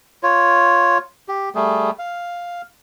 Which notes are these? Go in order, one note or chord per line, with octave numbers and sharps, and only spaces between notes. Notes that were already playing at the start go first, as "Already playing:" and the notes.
F4 C#5
G4
G3 A3 G#4
F5